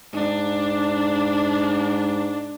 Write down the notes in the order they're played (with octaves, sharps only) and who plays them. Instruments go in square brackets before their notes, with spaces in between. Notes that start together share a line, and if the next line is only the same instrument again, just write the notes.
[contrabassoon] G#2 [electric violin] D4